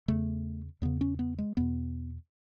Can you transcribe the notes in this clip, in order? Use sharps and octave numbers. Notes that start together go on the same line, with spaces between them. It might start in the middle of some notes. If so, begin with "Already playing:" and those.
E2 C#3 A3
E2 C#3 B3
C#4
B3
G#3
E2 B2 B3